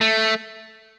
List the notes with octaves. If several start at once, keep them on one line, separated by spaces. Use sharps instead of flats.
A3